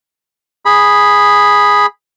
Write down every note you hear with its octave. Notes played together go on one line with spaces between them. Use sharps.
G#4 B5